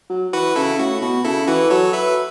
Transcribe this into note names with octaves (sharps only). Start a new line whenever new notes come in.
F#3
E3 F#4 B4
C#3 E4 A4
A2 F#4
B2 F#4
C#3 E4 A4
E3 F#4 B4
F#3 A4 C#5
B4 E5